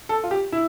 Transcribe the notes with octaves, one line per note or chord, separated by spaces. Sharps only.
A4
F4
G4
E4